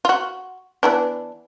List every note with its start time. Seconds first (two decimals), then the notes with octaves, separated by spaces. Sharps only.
0.05 F4 F#4
0.83 E3 B3 D4